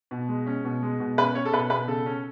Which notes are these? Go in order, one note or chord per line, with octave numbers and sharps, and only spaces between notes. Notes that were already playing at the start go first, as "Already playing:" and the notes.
B2
G#3
C#4
B2
G#3
B2
C#4 B4
C#4 C#5
A4
B2 B4
B2 B4
C#3 A4
C#4